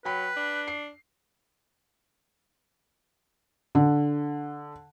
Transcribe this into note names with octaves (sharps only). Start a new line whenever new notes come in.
F#3 B4 G5 B5
D4
C7
D3